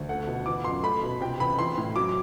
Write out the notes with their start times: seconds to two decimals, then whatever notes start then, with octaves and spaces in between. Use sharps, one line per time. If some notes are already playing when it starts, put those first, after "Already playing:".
Already playing: D2
0.09 A3 F#5
0.27 B2
0.46 E3 D6
0.64 F#2 C6
0.83 A3 B5
1.03 B2
1.21 C3 G5
1.40 E2 B5
1.59 E3 C6
1.77 A2
1.96 F#3 D6